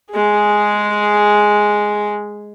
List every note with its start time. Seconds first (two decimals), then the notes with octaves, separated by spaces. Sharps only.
0.11 G#3 G#4